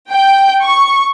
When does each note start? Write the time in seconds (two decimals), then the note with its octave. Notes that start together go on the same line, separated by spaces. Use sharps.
0.10 G5
0.62 C#6